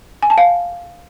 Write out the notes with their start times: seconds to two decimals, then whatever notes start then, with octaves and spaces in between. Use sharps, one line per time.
0.23 G#5
0.30 A5
0.38 F5